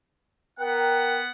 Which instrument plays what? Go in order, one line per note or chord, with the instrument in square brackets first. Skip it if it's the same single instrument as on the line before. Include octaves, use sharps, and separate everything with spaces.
[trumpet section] B3 F#5 [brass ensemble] A#4 G5